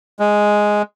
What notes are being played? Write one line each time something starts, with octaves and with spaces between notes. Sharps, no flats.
G#3